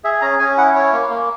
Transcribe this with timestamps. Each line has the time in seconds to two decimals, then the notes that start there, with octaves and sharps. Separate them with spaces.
0.04 G#4 E5
0.21 C#4 A#5
0.39 C#4 G#5
0.57 E4 F#5
0.75 E4 C#5
0.92 A#3
1.09 A#3